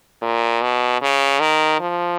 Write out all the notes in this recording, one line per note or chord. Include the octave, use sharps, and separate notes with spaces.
A#2
B2
C#3
D#3
F3